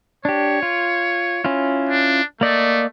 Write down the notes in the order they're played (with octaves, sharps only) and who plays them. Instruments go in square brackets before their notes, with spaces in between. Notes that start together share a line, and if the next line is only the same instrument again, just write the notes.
[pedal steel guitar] D4 G4 [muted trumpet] C#5
[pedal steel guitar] F4
C#4 E4 F4
[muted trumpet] D4
[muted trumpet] A3 [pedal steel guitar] A#3 D5 D#5